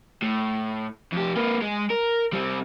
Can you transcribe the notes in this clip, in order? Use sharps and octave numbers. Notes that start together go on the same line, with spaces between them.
A2
F2 G4
A#3 B4
G#3
A#4
G3 C4